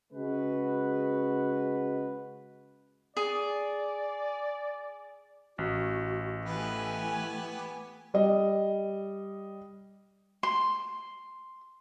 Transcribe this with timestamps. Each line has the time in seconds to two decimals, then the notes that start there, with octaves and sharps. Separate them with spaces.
0.13 C#3 G#3 F#4 B4
3.17 G#4 D5
5.58 A1 F#4
6.45 E3 A3 B3 G4 B4 G#5
8.14 G3 D#5
10.43 C6